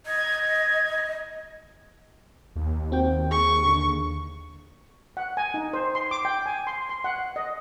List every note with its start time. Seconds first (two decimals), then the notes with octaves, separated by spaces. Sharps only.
0.06 D#5 G#6
2.56 D#2
2.92 C4 F#4 G5
3.31 G#4 C#6
3.66 D3
5.17 F#5
5.37 G#5
5.54 D#4
5.73 C5
5.95 C6
6.11 D6
6.25 G5
6.46 G#5
6.67 C6
6.89 C6
7.04 F#5
7.36 D#5